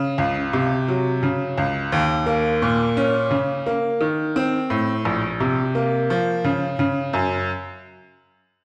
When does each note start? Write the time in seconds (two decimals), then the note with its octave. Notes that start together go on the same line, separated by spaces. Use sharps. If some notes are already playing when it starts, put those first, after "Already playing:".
Already playing: C#3
0.18 C#2
0.53 C3
0.88 F#3
1.23 C#3
1.58 C#2
1.92 D#2
2.26 A#3
2.62 A#2
2.97 C#4
3.31 C#3
3.66 A#3
4.01 D#3
4.36 C4
4.70 A2
5.05 A#1
5.40 C3
5.75 A#3
6.10 F3
6.44 C#3
6.79 C#3
7.13 F#2